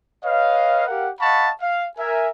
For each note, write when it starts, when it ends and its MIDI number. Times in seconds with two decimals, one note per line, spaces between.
0.24 0.87 71
0.24 0.87 73
0.24 0.87 75
0.24 0.87 77
0.87 1.08 67
0.87 1.08 70
0.87 1.08 77
0.87 1.08 78
1.20 1.50 75
1.20 1.50 77
1.20 1.50 78
1.20 1.50 81
1.20 1.50 83
1.20 1.50 85
1.61 1.86 77
1.98 2.29 70
1.98 2.29 76
1.98 2.29 80